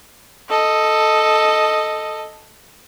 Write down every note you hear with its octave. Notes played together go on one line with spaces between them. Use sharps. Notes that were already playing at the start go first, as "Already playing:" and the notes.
A4 D#5